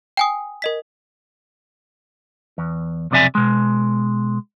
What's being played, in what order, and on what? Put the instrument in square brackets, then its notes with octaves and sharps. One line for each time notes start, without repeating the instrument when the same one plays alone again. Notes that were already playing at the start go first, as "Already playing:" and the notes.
[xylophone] G5 G#5 D#6
A#4 D#5 B6
[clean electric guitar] E2
B1 F2 C3 D5 E5 G#5
B2 G#3